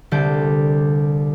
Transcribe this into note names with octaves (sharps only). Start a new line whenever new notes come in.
C2 D3 G3 D5 G6